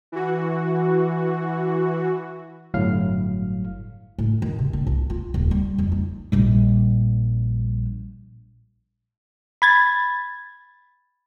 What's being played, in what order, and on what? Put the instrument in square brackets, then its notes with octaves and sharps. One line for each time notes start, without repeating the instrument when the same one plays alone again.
[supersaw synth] E3 F#4
[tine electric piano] G1 A2 F#3 F5 F6
[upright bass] A2
D#3
C3
D4
C2
F4
D#1
G3
F2
D#4
A#1 G3
[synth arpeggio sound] B5 G#6 A6